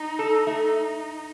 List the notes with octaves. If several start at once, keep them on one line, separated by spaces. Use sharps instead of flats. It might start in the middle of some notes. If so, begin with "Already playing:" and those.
Already playing: D#4
A4
A3